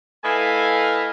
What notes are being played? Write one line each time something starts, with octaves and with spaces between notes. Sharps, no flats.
A3 E4 B4 D#5 F5 G#5